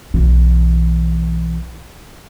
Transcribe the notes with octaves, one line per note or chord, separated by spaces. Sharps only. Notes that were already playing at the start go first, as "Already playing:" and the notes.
B1 E3